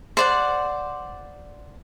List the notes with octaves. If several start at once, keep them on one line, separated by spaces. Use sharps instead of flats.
C5 D5 F#5